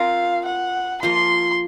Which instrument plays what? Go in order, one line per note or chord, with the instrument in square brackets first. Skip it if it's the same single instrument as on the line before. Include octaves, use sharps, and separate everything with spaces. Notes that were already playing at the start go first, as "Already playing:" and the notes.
Already playing: [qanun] C4 F4 A#4 [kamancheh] F5
[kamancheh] F#5
[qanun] F3 A#3 F4 [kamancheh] C6